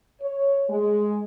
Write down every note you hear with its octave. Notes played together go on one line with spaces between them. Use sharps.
C#5
G#3